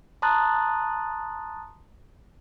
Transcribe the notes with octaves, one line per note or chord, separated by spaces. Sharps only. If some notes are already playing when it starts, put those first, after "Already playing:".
A5 A#5 C6 D#6 F#6 A6